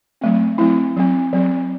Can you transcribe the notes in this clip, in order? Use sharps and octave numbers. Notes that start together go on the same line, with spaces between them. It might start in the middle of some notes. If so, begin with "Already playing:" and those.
F#3 A3 C4
F#3 A3 C4 E4
F#3 C4
F#3 C4